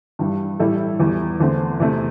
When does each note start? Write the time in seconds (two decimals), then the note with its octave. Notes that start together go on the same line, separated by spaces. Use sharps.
0.19 G2 E3 G3
0.60 A2 E3 G3 E4 A4
1.00 E2 E3 G3
1.40 E2 D3 A3 C4
1.80 E2 C3 A3